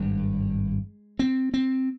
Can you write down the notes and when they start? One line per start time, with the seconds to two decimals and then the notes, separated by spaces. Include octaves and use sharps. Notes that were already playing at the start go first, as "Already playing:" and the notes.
Already playing: G#1 G2 G#3
1.19 C4
1.54 C4